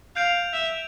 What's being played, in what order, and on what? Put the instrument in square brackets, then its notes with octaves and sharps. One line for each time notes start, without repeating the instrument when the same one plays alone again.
[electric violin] F5 [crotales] G6 D7 F7
[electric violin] E5